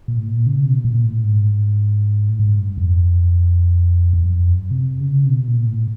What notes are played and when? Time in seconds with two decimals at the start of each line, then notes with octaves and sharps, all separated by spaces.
0.08 A#2
0.18 A2
0.27 A#2
0.46 C#3
0.65 B2
0.85 A#2
1.05 A2
1.24 G#2
2.30 A2
2.39 G#2
2.59 G2
2.78 F2
4.13 E2
4.25 F#2
4.32 F2
4.52 F#2
4.71 C3
5.01 C#3
5.25 C3
5.29 B2
5.48 A#2
5.67 A2